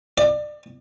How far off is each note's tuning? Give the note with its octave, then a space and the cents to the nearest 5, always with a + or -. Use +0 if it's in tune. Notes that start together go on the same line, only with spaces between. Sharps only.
D5 +25